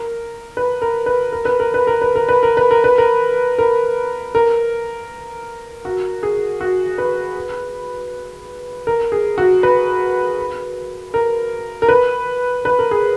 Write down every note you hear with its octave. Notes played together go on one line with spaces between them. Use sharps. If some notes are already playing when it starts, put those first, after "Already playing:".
Already playing: A#4
B4
A#4
B4
A#4
B4
A#4
B4
A#4
B4
A#4
B4
A#4
B4
A#4
B4
A#4
A#4
A#4
F#4
G#4
F#4
B4
A#4
G#4
F#4
B4
A#4
A#4
B4
B4
A#4
G#4